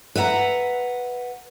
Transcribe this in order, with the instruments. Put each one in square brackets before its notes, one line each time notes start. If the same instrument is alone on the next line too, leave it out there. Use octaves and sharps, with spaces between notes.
[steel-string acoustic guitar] B4 E5 F#5 A#5